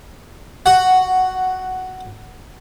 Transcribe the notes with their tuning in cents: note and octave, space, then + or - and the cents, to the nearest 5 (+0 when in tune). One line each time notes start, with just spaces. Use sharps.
F#4 +0 F#5 +10